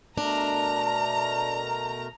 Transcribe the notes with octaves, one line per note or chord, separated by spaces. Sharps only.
B2 A3 D4 A#4 A#5